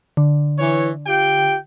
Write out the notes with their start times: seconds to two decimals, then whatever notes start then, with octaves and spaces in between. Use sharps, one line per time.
0.17 D3
0.59 E3 C#5
1.07 F4 G4 G5